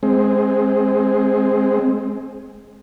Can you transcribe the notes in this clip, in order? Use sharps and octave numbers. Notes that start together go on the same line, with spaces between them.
G#3 C4